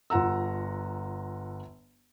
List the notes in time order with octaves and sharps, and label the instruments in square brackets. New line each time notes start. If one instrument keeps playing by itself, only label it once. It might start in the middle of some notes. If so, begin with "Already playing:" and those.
[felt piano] G1 F4 F#5 A#5 E6